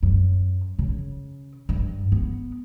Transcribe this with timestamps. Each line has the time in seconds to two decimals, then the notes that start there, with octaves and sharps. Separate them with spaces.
0.03 F#2
0.79 C#3
1.69 G2
2.12 B3